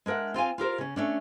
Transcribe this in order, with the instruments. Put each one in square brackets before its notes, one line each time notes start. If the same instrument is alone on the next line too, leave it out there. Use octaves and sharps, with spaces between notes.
[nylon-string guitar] G#3 D4 A#4 E5 F#5
C4 F4 F5 G#5
F4 G4 A#4 C5
C#3 C#4
A3 C#4 D4